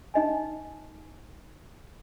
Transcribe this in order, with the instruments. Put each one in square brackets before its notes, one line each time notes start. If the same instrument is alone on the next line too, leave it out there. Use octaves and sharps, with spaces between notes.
[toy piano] D#4 D#5 G#5